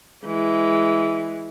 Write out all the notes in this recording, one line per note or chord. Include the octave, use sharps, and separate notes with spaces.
E3 G#3